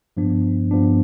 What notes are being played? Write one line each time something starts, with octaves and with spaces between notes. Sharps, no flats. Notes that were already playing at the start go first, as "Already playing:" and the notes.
G2 F3 B3 D4
G2 F3 B3 D4